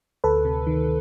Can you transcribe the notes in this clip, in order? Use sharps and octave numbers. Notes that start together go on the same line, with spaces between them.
D2 A4 B4
C3
D#3